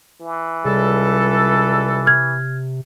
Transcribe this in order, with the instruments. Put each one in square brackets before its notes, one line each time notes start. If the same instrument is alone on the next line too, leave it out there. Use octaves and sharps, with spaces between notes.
[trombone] E3
[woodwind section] C#2 G3 A4 [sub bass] C3
[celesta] F6 G#6